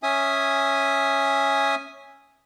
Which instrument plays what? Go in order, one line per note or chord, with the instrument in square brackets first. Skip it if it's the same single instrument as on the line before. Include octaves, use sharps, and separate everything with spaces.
[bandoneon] C#4 E5 G#5 D#6